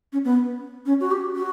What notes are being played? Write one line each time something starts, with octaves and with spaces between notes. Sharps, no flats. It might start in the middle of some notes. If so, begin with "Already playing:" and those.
C#4
B3
C#4
F#4
G4
F#4